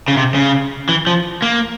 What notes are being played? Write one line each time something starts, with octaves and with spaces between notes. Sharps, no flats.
C#3
C3
C#3
E3
F3
A#3